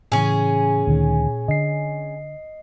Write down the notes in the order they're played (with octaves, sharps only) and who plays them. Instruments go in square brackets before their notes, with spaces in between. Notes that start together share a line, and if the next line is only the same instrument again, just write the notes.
[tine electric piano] A2 C#3 E3 [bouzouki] C#4 G#4
[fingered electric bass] D2 D#3 [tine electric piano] A#2
[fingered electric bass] D3 [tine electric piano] D#5 C7